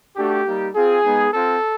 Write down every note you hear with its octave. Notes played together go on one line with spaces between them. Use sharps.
A3 D4 F#4 G4
G3 A#3 D#4
C4 F4 G#4
G#3 B3 D#4
C4 F4 A4